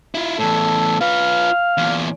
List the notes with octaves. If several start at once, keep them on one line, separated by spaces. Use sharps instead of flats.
E4 F4
E2 A2 A4
F4 B4 F5
E2 A#2